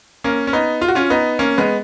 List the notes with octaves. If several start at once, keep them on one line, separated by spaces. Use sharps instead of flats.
A#3 C#4
C#4
B3 D#4
F4
F#4
C#4 F4
B3 D#4
A#3 C#4
G#3 B3